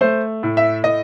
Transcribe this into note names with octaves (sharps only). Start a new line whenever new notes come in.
A3 C5
A2
E5
A2 D#5